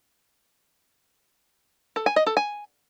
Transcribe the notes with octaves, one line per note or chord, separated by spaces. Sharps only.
A4
G#5
D#5
A4
G#5